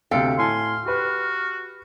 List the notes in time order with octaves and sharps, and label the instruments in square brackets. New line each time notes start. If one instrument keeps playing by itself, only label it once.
[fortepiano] D2 C3 [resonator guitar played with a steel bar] A4 F5 G5
[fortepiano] A2 G#5 A5 [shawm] C6 [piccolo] F6
[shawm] F#4 [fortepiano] G4 B4